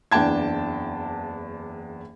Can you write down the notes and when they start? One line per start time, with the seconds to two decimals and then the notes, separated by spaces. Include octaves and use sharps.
0.12 F#1 E2 D4 G5 A5 G#6